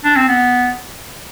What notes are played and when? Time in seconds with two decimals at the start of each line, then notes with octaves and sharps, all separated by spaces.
0.04 D4
0.16 C4
0.28 B3